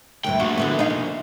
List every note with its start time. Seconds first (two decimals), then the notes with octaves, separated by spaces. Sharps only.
0.24 D2 G2 E3 G5
0.40 A#3 D4 F#4
0.57 D3 E3 B3
0.79 D#4 F5
0.90 C3